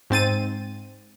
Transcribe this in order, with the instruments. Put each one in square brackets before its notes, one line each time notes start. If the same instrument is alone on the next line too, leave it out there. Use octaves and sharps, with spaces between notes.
[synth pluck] G#2 C4 A6 D#7